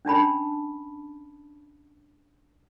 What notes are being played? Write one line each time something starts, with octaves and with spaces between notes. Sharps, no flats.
C#4 D4 A5 B5